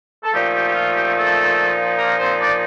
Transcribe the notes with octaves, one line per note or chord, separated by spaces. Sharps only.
A4
A#2 F3 A3 D#4 G4
G4
G4
F4
G4
A3 A4
A#3 A#4
C4 C5
D4 D5